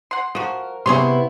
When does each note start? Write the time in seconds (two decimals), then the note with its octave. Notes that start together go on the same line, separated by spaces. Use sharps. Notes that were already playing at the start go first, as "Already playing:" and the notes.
0.11 F#5 C6
0.35 F3 F#4 A#4
0.86 C3 B3 E4 G#4 C#5 C6